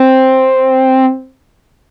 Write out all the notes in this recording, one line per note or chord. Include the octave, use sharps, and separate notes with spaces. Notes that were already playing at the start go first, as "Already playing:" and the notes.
Already playing: C4